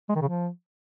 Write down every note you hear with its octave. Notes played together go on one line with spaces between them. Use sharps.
G#3
D#3
C#3
F3